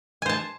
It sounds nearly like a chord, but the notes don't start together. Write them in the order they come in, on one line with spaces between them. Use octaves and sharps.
G#5 C5 A5